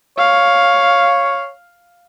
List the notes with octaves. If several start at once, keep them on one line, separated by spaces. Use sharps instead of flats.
C#5 F5